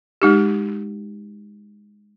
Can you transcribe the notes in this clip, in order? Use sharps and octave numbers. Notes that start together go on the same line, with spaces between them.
G#3 D#4 G4